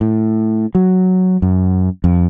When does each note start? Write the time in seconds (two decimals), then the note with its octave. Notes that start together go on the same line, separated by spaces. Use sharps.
0.01 A2
0.75 F#3
1.42 F#2
2.04 F2